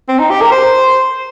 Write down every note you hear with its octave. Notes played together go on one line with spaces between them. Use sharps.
C4
D#4
G4
A#4
C5